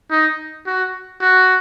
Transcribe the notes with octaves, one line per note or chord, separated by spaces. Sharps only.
D#4
F#4
F#4